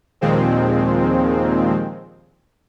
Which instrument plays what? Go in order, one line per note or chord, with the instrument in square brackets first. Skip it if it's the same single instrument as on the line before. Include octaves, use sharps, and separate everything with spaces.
[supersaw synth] D#2 A#2 D#3 F3 G#3 C4